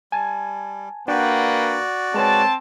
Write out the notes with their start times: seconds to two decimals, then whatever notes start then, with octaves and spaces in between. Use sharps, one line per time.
0.12 G3 G#5 A5 G#6
1.08 A#3 D4 F#4 B4 D5 F#5 G5 G6
2.14 G#3 C4 B4 C#5 A5